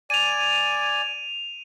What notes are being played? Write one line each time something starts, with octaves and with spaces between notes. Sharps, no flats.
D5 G#5 D#7 F7